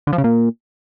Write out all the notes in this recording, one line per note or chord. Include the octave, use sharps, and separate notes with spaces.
D3
F3
C#3
A#2